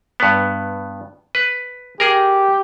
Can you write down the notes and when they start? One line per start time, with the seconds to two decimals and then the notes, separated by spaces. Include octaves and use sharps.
0.20 G2 B3
1.35 B4
2.00 G4 G#4 A#4